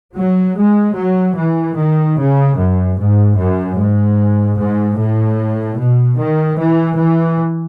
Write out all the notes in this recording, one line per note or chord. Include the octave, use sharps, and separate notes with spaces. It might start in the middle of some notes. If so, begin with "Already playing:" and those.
F#3
G#3
F#3
E3
D#3
C#3
F#2
G#2
F#2
G#2
G#2
A2
B2
D#3
E3
E3